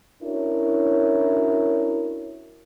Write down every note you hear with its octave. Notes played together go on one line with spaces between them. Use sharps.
C#4 D4 E4 F#4 A#4 C#5